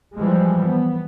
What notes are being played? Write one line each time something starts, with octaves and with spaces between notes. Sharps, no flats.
E3 F3 G3 G#3
B3